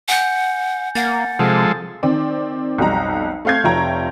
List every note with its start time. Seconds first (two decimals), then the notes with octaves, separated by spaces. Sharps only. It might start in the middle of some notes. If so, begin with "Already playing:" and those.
0.08 F#5 G#5 G6
0.95 A#3 F#5 A6
1.39 C3 F3 G#3 A4
2.03 D#3 C4 D5
2.78 B1 F2 G3 D#4 A#5
3.45 A3 C4 F5 G6 G#6
3.64 F1 F4 C#5 E5 G5 A#5